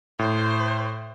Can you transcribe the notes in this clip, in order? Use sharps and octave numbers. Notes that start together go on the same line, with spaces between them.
A2 C5